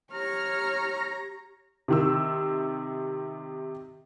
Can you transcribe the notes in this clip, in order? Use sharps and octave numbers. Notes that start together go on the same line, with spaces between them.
G4 C#5 A#5 F6
C3 D#3 E6